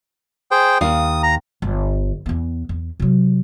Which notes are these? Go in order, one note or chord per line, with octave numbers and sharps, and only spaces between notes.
G#4 C5 G5
D#2 F5 D#6
A#5
G1
E2 B3
E2
C3 F#3